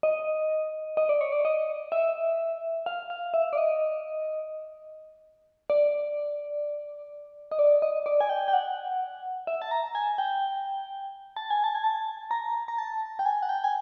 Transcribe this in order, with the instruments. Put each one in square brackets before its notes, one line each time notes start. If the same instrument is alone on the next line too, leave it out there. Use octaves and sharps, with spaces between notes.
[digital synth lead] D#5
D#5
D5
C#5
D5
D#5
E5
F5
F5
E5
D5
D#5
D5
D#5
D5
D#5
D5
G#5
G5
G5
F#5
E5
A5
A#5
G#5
G5
A5
G#5
A5
G#5
A5
A#5
A#5
A5
G5
G#5
F#5
G5
G#5